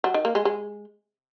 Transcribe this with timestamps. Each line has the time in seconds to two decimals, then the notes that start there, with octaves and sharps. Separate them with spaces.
0.04 F#3
0.14 D#3
0.25 A#3
0.35 G#3
0.45 G#3